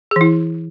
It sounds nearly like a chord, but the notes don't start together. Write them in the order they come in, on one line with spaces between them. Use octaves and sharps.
G#4 E3 E4